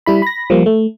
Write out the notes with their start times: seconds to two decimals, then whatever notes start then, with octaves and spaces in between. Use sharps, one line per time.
0.06 G3 E4 B5
0.22 B5 A#6
0.50 F3 G3 A#3
0.66 A3